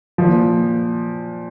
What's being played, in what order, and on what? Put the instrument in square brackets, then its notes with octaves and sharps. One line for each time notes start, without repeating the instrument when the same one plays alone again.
[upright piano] A#2 F3